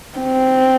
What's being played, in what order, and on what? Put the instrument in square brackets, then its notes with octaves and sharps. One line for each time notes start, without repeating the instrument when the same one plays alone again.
[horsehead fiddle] C4